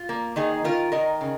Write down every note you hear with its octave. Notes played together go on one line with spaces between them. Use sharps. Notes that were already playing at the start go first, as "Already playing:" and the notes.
Already playing: F4
A#3
D#3 D#4 G#4
D#3 F4 A#4
D#3 A#4 D#5
C#3